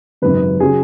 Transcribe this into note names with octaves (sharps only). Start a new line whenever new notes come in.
G#1 F#2 C#3 B4
C#3 F#3 G#4